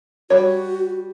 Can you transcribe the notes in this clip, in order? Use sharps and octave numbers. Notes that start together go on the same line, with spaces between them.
G3 F#4 C#5